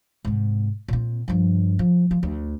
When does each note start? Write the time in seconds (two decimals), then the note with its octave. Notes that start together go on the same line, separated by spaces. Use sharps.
0.25 G#2 C3
0.88 A#2 C4
1.28 G2 F3
1.79 F3
2.11 F3
2.23 D2